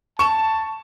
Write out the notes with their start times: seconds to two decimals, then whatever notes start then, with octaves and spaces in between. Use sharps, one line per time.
0.19 A5 C#6 E7